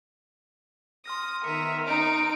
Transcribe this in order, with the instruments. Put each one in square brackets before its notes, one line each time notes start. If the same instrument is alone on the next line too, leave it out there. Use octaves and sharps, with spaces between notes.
[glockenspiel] C6 F6 A#6 [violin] D#6
[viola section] D#3 B3 A#4 [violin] E5 [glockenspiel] C#7 D#7
[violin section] D#4 [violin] D7